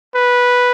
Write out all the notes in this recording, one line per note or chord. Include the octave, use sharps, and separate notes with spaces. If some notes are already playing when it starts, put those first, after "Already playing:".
B4